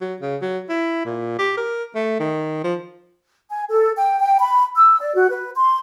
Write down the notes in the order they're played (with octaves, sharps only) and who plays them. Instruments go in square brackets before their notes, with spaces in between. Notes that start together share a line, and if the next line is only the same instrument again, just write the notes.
[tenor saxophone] F#3
C#3
F#3
E4
A#2
G4
A#4
A3
D#3
F3
[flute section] G#5
A4
G5
G5
B5
E6
D5
F#4
B4
C6